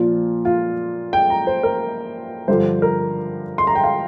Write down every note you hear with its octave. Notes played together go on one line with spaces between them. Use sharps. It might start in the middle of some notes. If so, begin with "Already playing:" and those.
Already playing: A#2 F3 F4
F4
G5
A#5
C5
A#4
G2 D3 F3 C5
A#4
C6
A#5
G5
F5